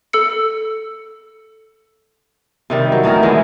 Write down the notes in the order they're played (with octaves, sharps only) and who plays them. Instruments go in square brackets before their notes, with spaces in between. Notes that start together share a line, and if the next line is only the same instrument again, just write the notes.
[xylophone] A4 E6 C#7
[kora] C3 D#3 G3
F#3
A2 D#3 E3 A#4
D3 E3 G#3 B3